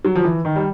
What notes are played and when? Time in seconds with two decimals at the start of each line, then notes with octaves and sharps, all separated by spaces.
0.05 F#3
0.15 F3
0.24 E3
0.45 D#3
0.56 G3